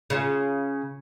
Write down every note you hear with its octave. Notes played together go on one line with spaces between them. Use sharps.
C#3 F4